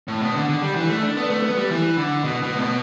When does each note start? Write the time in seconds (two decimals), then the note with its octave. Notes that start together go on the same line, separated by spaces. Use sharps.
0.08 A2
0.22 B2
0.36 D3
0.49 D3
0.62 G3
0.76 E3
0.89 A3
1.03 D4
1.17 B3
1.30 A3
1.43 B3
1.57 G3
1.70 E3
1.97 D3
2.24 B2
2.43 B2
2.56 A2
2.61 B2